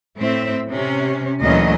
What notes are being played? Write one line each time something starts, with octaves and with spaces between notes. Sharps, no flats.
A2 C4 E5
C3 C#4
D2 A#2 E3 F#3 C#4 D#5